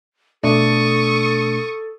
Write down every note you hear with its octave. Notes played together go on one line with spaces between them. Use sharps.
B2 A3 D4 A4 C#6 D#6